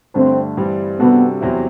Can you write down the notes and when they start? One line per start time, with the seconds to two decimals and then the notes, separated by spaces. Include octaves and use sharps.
0.14 G2 D3 A3 C4 D4
0.57 G2 E3 G3 C4
0.99 C3 G3 B3 D4 F#4 A4
1.41 E2 C3 F#3 C4 E4